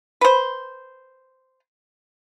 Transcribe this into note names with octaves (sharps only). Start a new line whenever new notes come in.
B4 C5